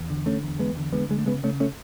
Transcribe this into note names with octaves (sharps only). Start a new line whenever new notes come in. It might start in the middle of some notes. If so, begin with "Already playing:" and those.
Already playing: E2
D3
D3 A3 C#4
E2
E2 G#3 B3
D3
D3 G#3 B3
D3 G#3
A3
C#3 G#3 B3
C#3 A3 C#4
A3 C#4